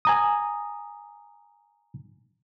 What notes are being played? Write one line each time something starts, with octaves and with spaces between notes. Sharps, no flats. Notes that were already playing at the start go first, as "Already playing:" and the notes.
G#5 A#5 D#6